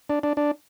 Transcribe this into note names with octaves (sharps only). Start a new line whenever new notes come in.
D4
D4
D4